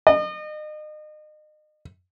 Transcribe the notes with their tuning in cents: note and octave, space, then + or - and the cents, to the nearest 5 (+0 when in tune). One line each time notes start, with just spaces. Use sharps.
D#5 -35